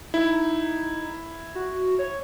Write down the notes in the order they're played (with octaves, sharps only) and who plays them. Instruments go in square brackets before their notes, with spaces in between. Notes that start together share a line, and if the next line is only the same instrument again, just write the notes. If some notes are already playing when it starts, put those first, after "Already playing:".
[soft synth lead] D#4 [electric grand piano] E4
[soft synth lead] F#4
C#5